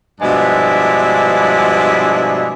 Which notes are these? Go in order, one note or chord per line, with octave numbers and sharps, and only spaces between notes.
G2 B2 F3 G#3 D4 E4